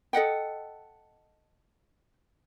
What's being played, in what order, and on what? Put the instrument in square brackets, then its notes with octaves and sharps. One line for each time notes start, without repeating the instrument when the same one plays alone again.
[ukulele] A4 D#5 F#5 G5